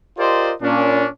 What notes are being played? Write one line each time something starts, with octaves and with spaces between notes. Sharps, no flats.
F4 G4 A#4 C5 D5 D#5
A#2 C#4 D4